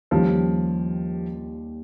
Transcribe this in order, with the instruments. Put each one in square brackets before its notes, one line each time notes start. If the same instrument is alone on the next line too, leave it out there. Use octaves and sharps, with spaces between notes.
[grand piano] D#2 D#3 G3 C#4 G4 [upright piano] F3